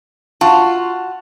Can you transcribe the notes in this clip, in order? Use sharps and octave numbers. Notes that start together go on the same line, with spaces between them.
F4 F#4 A5